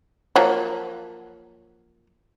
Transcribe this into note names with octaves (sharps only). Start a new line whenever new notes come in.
F3 F#3 A#3